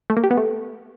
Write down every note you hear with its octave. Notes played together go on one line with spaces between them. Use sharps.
A3
A#3
G4
B3
A3